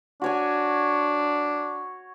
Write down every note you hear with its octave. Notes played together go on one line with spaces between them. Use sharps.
D4 F#4 C#5 G#5